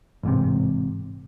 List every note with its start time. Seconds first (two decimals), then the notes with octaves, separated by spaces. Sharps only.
0.23 A1 G#2 C3